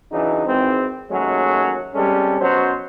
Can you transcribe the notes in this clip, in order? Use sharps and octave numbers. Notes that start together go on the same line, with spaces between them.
C#3 E3 F#3 D4 D#4
G#1 G#2 E3 C4
D#2 F#3 G#3 A3 C#4
C3 G3 G#3 C#4 A4
B2 F#3 C#4 C5